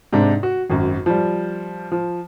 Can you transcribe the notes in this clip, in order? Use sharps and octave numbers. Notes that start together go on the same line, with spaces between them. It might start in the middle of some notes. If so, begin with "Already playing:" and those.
G#2 C3 D4
F#4
G#1 F#2
F3 G3
F3